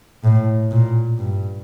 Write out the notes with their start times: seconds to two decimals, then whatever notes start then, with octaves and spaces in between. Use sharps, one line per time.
0.24 A2
0.71 A#2
1.18 G2